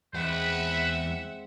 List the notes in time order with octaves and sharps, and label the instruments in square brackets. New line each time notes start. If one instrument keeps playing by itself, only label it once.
[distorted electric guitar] E2 [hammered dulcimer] G#3 C4 G#4 [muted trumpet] B4 [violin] E5 F#5